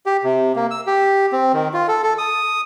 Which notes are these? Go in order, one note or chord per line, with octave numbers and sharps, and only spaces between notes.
G4
C3
A#3
E6
G4
C4
D#3
F4
A4
A4
D#6